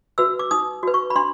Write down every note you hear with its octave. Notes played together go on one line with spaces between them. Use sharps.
F#4 B4 E6
D6
D#4 D#6
F#4 B4
C#6
B5
D4 C6